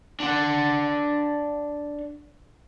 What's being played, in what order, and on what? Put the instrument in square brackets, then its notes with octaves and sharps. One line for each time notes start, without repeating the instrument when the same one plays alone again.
[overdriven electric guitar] D4 F#5